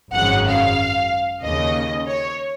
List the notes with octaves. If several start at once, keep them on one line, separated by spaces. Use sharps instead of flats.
G#1 F#2 C#3 F#5
F5
D#2 C#3 D#5
C#5